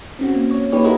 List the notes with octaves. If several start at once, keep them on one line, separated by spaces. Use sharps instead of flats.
C4 C#4 F#4
A#3
C#5
A#3 D#4 G4 B4 C#5
E4 F#4 G#4 A#4 B4 D#5